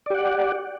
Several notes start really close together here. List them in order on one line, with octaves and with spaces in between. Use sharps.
D5 G4 F#5